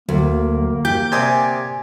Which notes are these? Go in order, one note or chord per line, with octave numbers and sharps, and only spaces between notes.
D2 F#3 A#3
G4 G6
C3 D5 G#5 D#6 G#6